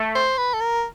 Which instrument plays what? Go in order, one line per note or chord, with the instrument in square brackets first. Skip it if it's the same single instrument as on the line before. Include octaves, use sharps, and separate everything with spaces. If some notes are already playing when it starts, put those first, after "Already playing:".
Already playing: [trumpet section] A3
[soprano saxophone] C5
B4
A4
A#4